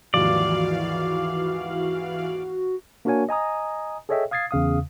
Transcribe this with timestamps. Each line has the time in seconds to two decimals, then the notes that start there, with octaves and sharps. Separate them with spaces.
0.14 D#2 G#2 E3 F3 F#4 D5 F5
3.05 A#3 D4 F#4 A#4 C#5 G#5
3.29 D#5 G#5 A#5 D#6
4.09 G#4 A4 C#5 D#5 E5 G5
4.31 F5 D#6 G#6 A6 C7
4.51 E2 C#3 F5 D#6